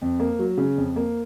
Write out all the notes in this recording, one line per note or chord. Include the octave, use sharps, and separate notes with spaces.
F2
A#3
F#3
C#3
F2
A#3